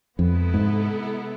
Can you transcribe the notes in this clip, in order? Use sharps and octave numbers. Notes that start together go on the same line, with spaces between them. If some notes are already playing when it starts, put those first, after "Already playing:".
F2 C3 G#3 B3 E4 A4
G#2